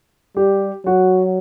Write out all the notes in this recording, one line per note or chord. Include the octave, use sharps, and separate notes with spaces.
G3 G4
F#3 F#4